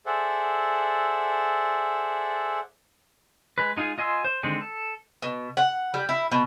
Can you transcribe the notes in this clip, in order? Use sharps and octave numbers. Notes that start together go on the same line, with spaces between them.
G#4 A4 C5 D5 E5 F#5
G#3 B4
G#3 D#4 F4 G#4
F4 D#5 G#5 C6 E6
C5
D3 D#3 G#3 C4
A4
B2
F#5
G3
E4
B2